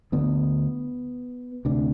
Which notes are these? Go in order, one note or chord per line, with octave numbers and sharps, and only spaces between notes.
D2 D3 B3
D2 C3 D4